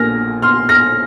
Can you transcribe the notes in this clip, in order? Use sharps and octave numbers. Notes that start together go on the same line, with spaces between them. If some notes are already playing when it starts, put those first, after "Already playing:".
Already playing: A#1 A#2 A#3 F6 A#6
C6 F6
F6 A#6